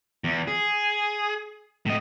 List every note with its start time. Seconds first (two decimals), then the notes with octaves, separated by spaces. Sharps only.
0.24 E2
0.47 G#4
1.86 A2 D#5